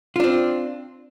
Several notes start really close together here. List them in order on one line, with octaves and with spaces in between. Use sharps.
F4 D4 C4